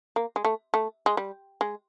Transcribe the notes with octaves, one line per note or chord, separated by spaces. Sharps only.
A#3
G#3
A3
A3
G#3
G3
G#3